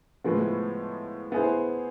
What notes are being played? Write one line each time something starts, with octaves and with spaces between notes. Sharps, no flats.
A2 F3 G#3 B3
B3 E4 G#4 C5